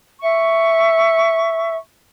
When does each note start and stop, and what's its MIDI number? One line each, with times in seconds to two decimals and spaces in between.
0.20 1.74 76
0.20 1.74 85